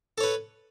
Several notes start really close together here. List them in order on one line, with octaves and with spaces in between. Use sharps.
A4 C#5 B4